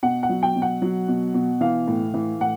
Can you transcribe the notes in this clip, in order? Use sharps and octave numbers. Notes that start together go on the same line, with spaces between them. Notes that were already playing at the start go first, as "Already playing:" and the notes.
B2 F#5
F#5
F#3
G5
B2
F#5
F#3
B2
B2
E3 F5
A2
E3
A2 F#5